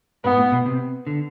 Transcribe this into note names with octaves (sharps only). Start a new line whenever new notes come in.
G#2 B3
A2
B2
C3
D3